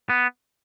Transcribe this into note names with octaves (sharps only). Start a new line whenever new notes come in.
B3